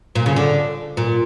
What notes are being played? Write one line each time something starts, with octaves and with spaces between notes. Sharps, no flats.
A#2
C#3
D3
A#2